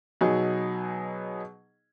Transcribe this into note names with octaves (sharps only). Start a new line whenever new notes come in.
B2 F#3 D#4 G#4